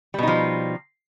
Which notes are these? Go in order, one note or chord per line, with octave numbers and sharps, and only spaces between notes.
B2 F3 G3 D#4